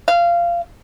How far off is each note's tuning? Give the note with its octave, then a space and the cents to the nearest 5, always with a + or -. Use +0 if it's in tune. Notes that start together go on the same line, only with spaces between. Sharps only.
F5 -20